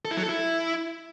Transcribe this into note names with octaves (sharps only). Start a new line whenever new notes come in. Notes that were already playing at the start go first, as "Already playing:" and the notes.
A4
E4
F#3
A4
E4